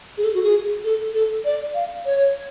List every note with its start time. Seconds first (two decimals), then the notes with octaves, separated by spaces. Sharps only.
0.18 G#4
0.24 A4
0.34 F#4
0.44 G#4
0.84 A4
1.14 A4
1.45 D5
1.75 F5
2.06 C#5